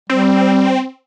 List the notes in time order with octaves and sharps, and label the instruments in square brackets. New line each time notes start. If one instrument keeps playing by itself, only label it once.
[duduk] G3 [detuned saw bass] C4